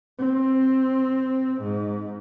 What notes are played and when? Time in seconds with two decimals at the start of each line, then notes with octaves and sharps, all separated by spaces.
0.19 C4
1.62 G#2